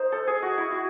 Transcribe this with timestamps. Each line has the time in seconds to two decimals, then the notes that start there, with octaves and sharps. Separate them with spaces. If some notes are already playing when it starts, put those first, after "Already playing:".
Already playing: D#4 C5
0.12 A4
0.27 G#4
0.42 F#4
0.58 E4
0.72 F#4